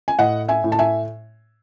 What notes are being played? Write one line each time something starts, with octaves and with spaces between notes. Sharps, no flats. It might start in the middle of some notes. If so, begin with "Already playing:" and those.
G#5
A2 D#5 F#5
E5 G#5
A2
A5
E5 G#5